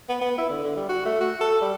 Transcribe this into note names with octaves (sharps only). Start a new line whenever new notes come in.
B3
B3
E4
D3
D3
G3
F#4
A3
F#4
A4
G3